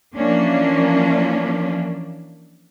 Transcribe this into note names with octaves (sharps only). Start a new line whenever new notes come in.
E3 F3 A#3 C#4 D4